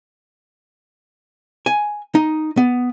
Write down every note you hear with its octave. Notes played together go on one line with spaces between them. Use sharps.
G#5
D#4
B3